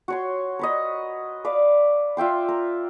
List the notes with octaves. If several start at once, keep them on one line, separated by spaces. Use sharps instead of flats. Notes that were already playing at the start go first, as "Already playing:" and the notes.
F#4 C#5 C6
A#4 B4 D#5
B4 D5 F5
F4 E5 G5 C6
A#4